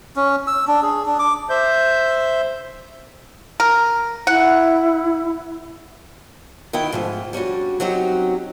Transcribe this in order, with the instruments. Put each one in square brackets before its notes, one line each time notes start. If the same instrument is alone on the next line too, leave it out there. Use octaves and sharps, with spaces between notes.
[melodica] C#4
E6
D4
G#4
D4
D6
[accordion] C5 E5 G6
[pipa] A#4
[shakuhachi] E4 [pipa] F#5
[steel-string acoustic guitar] D#3 B3 E4 G5
G#2 F3 A3
G3 C#4 D4 F#4
F#3 C4 C#4 D#4 F#4 G4